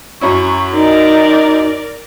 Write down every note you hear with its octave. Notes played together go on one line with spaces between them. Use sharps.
F#2 C#4 E4 C#6
D#4 A#4 D5